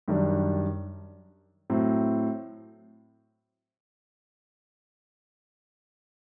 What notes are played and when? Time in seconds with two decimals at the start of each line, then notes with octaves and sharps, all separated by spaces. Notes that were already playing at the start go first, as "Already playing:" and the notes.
0.08 F#2 D#3 G3 D4
1.70 A2 F#3 C4